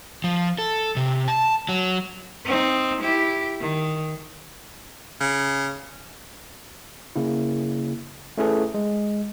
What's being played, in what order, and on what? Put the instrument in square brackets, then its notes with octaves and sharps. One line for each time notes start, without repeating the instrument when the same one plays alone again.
[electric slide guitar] F3
A4
C3
A5
F#3
[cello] C4 D#4
E4 G4
D#3
[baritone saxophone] C#3
[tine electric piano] C#3 A#3 E4
A3 C#4 E4 G#4 A4 B4
G#3